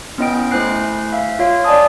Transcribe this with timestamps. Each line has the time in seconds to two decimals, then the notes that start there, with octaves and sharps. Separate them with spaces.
0.18 B3 C#4 E4 D#5 G5 D7
0.51 A3 E4 C5 G#5 F#6 C7
1.13 E5 F5
1.39 F4 C#5 F5
1.64 D5 D#5 G#5 A5 D#6